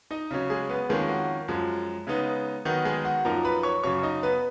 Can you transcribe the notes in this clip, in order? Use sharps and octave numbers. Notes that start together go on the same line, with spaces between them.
D#4 D#5
C#3 F#3 C#4
G#3 G#4
B3 B4
F2 D#3 G#3 A#3 C#4 G#4
F#4
F#2 F3 G#3
C#3 G#3 B3 D#4
D#3 F#3 B3 D#4 F#4
G#3 G#4
F#4 F#5
F#2 F3 A#3 D#4 A#4 A#5
B4 B5
C#5 C#6
F#2 C#3 F#3 C#5 C#6
D#4 D#5
B3 B4